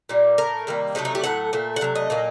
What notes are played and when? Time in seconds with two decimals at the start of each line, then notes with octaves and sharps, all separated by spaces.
0.09 A#2 G3 A#3
0.38 A2 A3 A#4
0.67 C3 D#3 G3 A#3
0.95 C3 F#3 A3 D#4
1.05 D#4
1.15 G4
1.23 A2 F#3 A3 F#5
1.53 A#2 A3
1.76 F#5
1.81 C3 F#3 A3
1.96 D#5
2.10 A#2 F#3 A#3